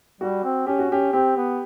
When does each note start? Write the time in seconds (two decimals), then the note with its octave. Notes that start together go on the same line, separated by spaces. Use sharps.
0.21 G3 F#4
0.44 C4
0.67 C#4 G4
0.79 F#4
0.91 C#4 G4
1.13 C4 G4
1.36 B3